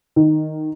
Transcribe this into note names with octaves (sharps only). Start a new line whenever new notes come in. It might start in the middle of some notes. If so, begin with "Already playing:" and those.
D#3